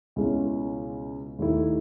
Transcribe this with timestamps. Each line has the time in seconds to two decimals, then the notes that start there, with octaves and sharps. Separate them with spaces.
0.16 C#2 B2 G#3 C#4 E4
1.39 D#2 D#3 A3 E4